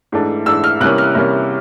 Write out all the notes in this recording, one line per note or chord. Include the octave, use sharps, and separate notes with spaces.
G#2 E3 A3 D4
G#2 E3 A3 D4 E6
F6
C3 E3 G3 A#3 C#4 F#6
F6
C3 E3 G3 A#3 C#4